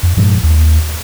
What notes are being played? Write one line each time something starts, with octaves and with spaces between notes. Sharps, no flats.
F2
G2 A#2 F3 G#3
D1 D#2